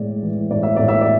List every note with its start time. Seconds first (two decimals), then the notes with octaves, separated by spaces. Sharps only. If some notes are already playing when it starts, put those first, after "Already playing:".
Already playing: A2 G#3 D5
0.23 E3
0.51 A2 D5
0.63 E5
0.76 A2 D5
0.88 E5
1.01 D5